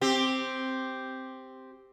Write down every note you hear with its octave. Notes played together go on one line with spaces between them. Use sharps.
C4 G4